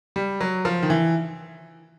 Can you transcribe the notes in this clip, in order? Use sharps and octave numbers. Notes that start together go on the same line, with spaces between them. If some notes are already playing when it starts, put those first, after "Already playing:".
G3
F#3
F3
D#3
E3